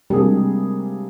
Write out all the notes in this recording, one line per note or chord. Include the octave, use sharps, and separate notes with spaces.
C3 G3 G#3 A#3 D4 G#4